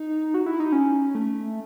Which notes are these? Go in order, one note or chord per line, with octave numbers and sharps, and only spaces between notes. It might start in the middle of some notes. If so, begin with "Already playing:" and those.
Already playing: D#4
F#4
E4
D#4
C#4
A3